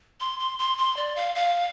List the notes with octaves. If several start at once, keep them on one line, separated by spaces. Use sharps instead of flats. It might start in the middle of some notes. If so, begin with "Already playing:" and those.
C6
C6
C6
C6
D5
F5
F5